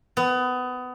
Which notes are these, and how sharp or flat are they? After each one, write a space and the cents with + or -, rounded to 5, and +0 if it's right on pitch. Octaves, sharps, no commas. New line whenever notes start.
B3 +25